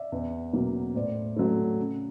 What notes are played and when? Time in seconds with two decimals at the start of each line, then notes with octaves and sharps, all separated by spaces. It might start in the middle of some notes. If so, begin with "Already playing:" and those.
Already playing: D5 E5
0.12 E2
0.53 B2 F#3 A#3
0.95 A2 C5 D5
1.36 F#3 A3
1.79 C#3